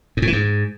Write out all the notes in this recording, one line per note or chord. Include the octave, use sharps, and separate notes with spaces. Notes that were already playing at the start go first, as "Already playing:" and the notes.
G#2
A2
E3
G#2